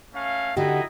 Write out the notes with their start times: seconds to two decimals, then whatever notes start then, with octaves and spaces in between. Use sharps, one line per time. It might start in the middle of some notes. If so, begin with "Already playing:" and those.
0.14 A3 C#4 F5
0.57 D3 D#4 E4 F#4 G4 D#5